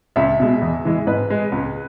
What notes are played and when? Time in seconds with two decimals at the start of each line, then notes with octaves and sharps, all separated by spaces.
0.16 C#2 E5
0.40 B2 G#3
0.61 E2
0.85 E3 G#3
1.07 G#2 B4
1.30 G#3
1.52 C#2